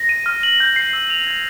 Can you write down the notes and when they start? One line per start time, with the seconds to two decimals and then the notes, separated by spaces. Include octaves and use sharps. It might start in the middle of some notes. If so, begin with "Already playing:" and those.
Already playing: A#6
0.09 D#7
0.26 F6
0.43 F#7
0.60 G6
0.76 C7
0.93 E6
1.10 F7
1.27 G#6